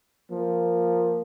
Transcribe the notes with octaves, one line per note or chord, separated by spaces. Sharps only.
F3 A#3